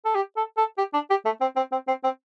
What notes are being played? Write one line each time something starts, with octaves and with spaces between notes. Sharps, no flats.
A4
G4
A4
A4
G4
D4
G4
A3
C4
C4
C4
C4
C4